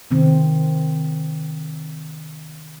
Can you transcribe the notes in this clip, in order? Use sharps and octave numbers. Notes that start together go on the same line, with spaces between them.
C3 D#3 C4